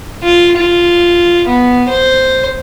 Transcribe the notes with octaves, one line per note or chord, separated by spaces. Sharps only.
F4
F4
B3
C5